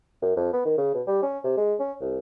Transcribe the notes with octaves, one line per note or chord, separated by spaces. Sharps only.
F#2
F2
B3
D#3
C#3
B2
G3
C#4
C3
G#3
C#4
C2